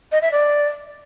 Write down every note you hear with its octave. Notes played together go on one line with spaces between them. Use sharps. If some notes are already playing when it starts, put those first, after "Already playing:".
D#5
E5
D5